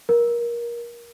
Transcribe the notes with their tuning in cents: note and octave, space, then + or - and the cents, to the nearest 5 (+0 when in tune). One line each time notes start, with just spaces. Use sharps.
A#4 +20